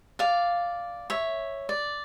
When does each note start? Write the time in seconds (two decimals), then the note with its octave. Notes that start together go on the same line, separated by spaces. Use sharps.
0.19 D5 F5
1.10 C#5 E5
1.69 D5